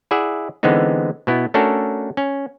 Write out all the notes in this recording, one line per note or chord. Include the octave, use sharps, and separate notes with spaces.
E4 G#4 D5 E5 F#5
D3 E3 G#3 B3 C4 D#4
B2 B3 E4
A3 C#4 D4 F#4 A4 A#4
C#4